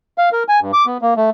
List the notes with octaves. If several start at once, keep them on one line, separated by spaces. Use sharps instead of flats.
F5
A#4
G#5
G2
D6
B3
A#3
A3